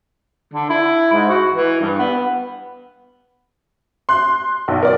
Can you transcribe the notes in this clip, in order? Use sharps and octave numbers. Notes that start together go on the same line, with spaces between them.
D3
E4
G#2
F#4
E3
G2
B3
C6 F#6
B1
A#4 D5